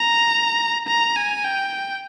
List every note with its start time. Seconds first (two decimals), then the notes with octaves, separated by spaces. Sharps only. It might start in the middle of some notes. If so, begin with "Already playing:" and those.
Already playing: A#5
0.88 A#5
1.16 G#5
1.44 G5